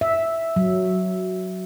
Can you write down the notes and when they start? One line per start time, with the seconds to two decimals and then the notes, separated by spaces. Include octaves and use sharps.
0.01 E5
0.56 F#3